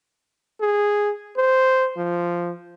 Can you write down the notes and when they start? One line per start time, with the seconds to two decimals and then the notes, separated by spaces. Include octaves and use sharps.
0.61 G#4
1.37 C5
1.97 F3